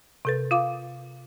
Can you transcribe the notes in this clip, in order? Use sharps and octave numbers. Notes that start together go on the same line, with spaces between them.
C3 A4 B4
F4 F5 D6